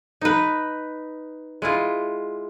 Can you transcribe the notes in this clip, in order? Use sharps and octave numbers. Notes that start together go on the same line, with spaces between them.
D#4 B4
G#3 E4 F4